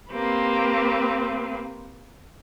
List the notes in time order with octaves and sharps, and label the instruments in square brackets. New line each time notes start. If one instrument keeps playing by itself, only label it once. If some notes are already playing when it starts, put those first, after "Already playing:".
[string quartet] A#3 C4 G4 B4